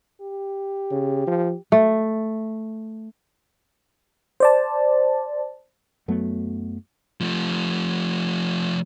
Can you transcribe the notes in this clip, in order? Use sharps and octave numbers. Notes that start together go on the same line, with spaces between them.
G4
C#3
F3
A3
C5 D5 A5
F#2 F#3 A3 B3
F3 A3